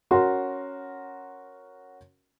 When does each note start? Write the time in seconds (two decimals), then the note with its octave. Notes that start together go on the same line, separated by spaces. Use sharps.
0.11 C#4 F#4 A#4 C6